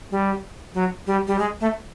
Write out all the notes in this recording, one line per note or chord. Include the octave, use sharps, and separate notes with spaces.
G3
F#3
G3
G3
G#3
A3